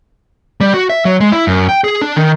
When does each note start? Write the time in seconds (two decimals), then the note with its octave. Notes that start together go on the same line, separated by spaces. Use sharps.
0.61 G3
0.74 F#4
0.89 E5
1.05 F#3
1.20 G#3
1.32 E4
1.47 F#2
1.69 G5
1.84 G#4
2.02 D4
2.16 D#3